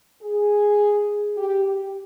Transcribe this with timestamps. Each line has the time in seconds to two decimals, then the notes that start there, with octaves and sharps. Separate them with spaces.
0.22 G#4
1.37 G4
1.65 G4